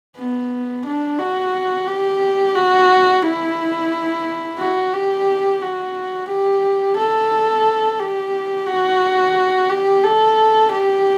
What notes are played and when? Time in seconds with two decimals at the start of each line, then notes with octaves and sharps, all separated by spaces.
0.17 B3
0.85 D4
1.19 F#4
1.87 G4
2.56 F#4
3.23 E4
4.59 F#4
4.93 G4
5.62 F#4
6.29 G4
6.97 A4
7.99 G4
8.67 F#4
9.70 G4
10.03 A4
10.71 G4